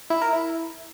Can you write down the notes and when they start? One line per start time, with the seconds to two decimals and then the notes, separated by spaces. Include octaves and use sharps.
0.10 E4
0.22 A#4
0.33 E4